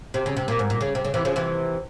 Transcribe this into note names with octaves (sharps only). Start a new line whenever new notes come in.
C3
C#3
C3
A#2
G#2
A#2
C#3
C3
C#3
C3 E3
C#3 F3
C3 E3